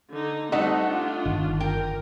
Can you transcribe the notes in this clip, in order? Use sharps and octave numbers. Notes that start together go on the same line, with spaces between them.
D3 D#4
G3 A3 C4 D#4 D#5 F#5
D4 F4
G1 D#3
A#4 G5